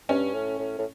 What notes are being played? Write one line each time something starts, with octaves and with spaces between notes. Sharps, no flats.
G2 C#4
A2
A2
A2